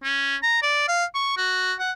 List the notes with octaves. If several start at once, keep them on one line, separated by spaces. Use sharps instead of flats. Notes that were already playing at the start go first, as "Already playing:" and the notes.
C#4
A#5
D5
F5
C#6
F#4
F#5